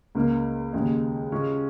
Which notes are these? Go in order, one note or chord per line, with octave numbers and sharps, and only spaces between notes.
C#2 C#3 A#3
D#2 C#3 G#3
C#3 G#3 C#4 F4